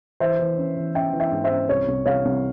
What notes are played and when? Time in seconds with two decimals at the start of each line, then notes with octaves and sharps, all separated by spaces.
0.20 E3 C5 E5
0.39 E3
0.58 C#4
0.77 E3
0.95 C#4 E5 G5
1.13 E3
1.20 E5 G5
1.32 G#2
1.44 C5 E5
1.50 C#4
1.69 C2 C#5
1.88 C2
2.06 C2 C#5 F5
2.25 C2